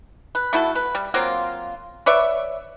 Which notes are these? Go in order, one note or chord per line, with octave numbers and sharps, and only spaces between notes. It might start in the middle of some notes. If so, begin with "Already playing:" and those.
B4
A3 E4 F#4 A4
B4
G3
F#3 A#3 C4 F4
B4 C#5 D5 E5